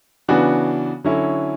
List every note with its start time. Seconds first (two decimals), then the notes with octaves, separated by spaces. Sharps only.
0.28 C#3 E3 B3 D4 F#4
1.04 D3 F#3 C#4 E4